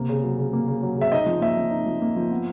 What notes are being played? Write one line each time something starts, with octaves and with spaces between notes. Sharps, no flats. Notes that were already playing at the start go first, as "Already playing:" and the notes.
Already playing: C3 A#3
C#3
F#3
C#3
A#3
C#3
F#3
C#3 E5
D#4 D#5
F3
A#3 E5
F3
D#4
F3
A#3
F3
B3